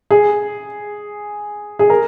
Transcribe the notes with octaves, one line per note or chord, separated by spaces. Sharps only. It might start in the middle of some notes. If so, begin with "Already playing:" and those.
G#4
G#4
A#4